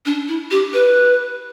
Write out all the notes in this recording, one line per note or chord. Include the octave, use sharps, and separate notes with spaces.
D4
E4
G4
B4